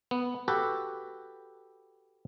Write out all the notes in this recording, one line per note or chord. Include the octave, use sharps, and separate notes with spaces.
B3
F#4 G4 A4 B4